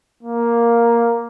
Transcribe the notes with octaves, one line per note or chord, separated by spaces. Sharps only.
A#3